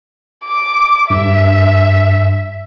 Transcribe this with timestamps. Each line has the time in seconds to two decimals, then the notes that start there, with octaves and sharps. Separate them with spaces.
0.45 D6
1.10 G2 E5